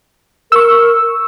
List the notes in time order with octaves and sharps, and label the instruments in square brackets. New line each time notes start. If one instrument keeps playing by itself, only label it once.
[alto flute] A#4 [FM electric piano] C#6 E6